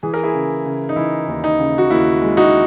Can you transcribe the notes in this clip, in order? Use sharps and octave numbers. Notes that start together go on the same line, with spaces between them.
E3 G#4
A#4
E4 G#4
C#3
C#3
D#4
E3 E4
D#2
D#4
C#3
F#4
D#2 E4
G#3
D#4 F#4